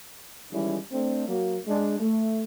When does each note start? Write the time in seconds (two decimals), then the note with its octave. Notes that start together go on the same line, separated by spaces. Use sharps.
0.52 D#3 E3 G3 G#3 C#4 E4
0.92 A3 C4 D4
1.28 F#3 A#3
1.67 G#3 D4
2.00 A3